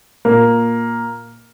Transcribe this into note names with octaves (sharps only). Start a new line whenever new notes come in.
A#2 A#3